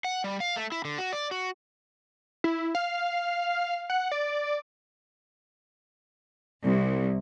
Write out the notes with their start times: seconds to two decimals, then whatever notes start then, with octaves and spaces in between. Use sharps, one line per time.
0.04 F#5
0.24 G3
0.40 F5
0.56 A3
0.72 E4
0.85 D3
0.99 F#4
1.13 D5
1.31 F#4
2.44 E4
2.75 F5
3.90 F#5
4.12 D5
6.63 C2